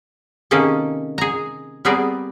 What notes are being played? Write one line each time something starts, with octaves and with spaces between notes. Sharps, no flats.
C3 D#3 A#3 C#4 G#4 A4
G#4 A#5
G3 B3 C4 G#4 A#4 D5